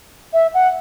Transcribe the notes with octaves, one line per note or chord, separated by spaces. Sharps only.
E5
F#5